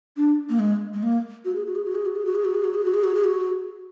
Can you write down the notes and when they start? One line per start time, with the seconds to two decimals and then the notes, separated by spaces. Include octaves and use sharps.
0.17 D4
0.50 A#3
0.59 G#3
0.94 G#3
1.03 A#3
1.45 F#4
1.55 G#4
1.66 F#4
1.75 G#4
1.85 F#4
1.95 G#4
2.06 F#4
2.16 G#4
2.25 F#4
2.35 G#4
2.45 F#4
2.55 G#4
2.64 F#4
2.75 G#4
2.85 F#4
2.94 G#4
3.04 F#4
3.15 G#4
3.24 F#4